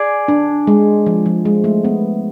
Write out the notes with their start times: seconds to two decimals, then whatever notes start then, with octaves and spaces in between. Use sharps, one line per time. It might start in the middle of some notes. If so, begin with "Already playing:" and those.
Already playing: G#4 D5
0.28 D4
0.67 G#3
1.06 F3
1.26 F3
1.45 G#3
1.64 A3
1.84 B3